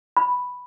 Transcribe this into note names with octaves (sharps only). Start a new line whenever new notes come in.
B5